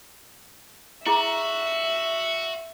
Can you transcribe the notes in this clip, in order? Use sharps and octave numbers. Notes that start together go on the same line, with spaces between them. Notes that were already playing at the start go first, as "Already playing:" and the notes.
E4 F#4 G#4 E5 A#5